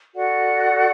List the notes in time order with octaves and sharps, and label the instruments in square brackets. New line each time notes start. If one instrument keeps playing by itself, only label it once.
[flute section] F#4 A4 D5 F#5